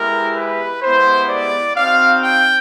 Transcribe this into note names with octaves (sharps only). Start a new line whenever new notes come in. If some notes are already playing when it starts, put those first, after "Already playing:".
Already playing: G#3 B3 E4 G4 A#4
B4
G#3 B3 E4 G4 C5
D5
C4 D#4 F#4 F5
G5